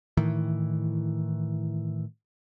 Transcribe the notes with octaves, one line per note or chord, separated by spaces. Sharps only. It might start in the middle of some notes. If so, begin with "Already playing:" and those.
A2 D#3 E3